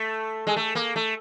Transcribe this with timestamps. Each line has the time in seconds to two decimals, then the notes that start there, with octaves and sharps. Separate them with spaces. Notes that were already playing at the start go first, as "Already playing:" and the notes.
Already playing: A3
0.47 G#3
0.56 A3
0.75 A#3
0.96 A3